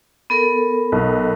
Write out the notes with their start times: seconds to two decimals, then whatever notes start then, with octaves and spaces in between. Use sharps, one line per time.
0.30 B3 A4 A#4
0.92 B1